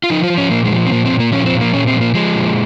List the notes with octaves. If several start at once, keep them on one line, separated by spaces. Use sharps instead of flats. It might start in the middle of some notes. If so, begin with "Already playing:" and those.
F4
F3 D#4
F4
F3
C#4
A#2 A#3
G#3
F3
C4
A#2 A#3
C4
A#2
A#3
F3 C#4
C4
A#2
A#3
A#2 C#4
C4
F3
A#3
F3 G#3
A#2